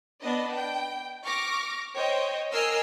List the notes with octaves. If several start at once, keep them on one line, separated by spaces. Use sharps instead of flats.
B3 D4 D#5
G5
C#6 D6 F6 A#6
C5 C#5 D#5 G5
A#4 D#5 G#5 E6 F6 C7